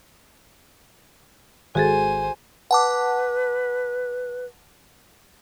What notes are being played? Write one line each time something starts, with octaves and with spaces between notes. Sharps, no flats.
G#1 F#4 G#4 A4 C5 G#5
B4 F#5 A5 D6